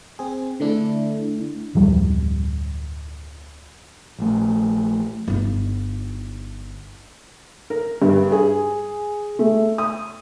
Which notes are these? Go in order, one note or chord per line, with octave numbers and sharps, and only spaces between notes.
C4 G#4
D3 A3 D4 E4
D1 F2 G3
A#1 A3
G1 D#4
A#4
G2
G#4
A3
D#6